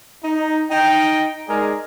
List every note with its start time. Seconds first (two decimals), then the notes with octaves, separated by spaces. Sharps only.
0.23 D#4
0.71 D#4 G5
1.49 G#3 D#4 G#4 A#4 D5